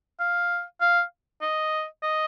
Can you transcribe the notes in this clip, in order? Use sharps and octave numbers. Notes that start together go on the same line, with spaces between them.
F5
F5
D#5
D#5